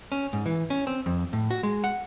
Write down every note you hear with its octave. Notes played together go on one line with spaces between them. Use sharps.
C#4
G#2
E3
C#4
C4
F2
A2
F#4
G#3
F#5